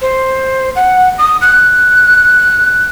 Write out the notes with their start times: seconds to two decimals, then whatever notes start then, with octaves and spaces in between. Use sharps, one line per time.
0.01 C5
0.75 F#5
1.18 D#6
1.41 F#6